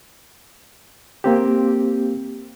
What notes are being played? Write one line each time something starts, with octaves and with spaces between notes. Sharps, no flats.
A#3 C4 G4